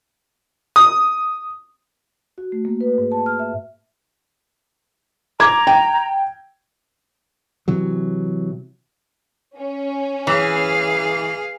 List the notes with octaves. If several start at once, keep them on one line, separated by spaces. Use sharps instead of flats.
D#6
F#4
A3
A#3
B4
G#2
A5
F6
E5
A#5 D6 G#6
G5
C3 E3 F#3
C#4
E3 G#4 F5